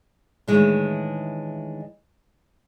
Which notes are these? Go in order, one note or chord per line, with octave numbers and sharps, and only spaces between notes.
A2 D#3 E3 G#3 D4